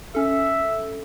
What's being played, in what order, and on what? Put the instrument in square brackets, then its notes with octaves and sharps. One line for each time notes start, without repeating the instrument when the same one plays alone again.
[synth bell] C#4 A4 [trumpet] E5